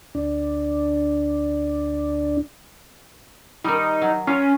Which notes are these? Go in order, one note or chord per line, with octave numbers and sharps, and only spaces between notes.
D2 D4
D#3 G3 D#4
F#3
C#4 F4